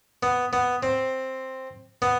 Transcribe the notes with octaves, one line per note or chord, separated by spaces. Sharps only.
B3
B3
C4
B3